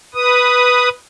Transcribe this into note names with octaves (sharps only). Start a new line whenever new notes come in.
B4 D#6